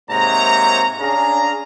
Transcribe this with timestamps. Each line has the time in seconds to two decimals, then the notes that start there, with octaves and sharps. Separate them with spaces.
0.10 G#2 C3 A#3 C#5 A#5
1.01 C#4 D4 G#4 F5 A#5